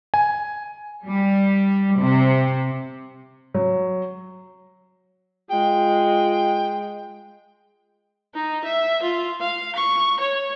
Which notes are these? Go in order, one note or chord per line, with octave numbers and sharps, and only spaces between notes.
G#5
G3
C3
F#3
G#3 F4 G5
D#4
E5
F4
F5
C#6
C#5